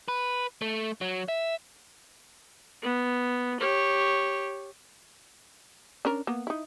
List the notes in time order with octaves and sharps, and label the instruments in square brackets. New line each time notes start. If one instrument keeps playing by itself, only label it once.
[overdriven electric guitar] B4
A3
F#3
E5
[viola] B3
G4 C#5
[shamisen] C#4 D4 A#4
A#3 B3
D#4 E4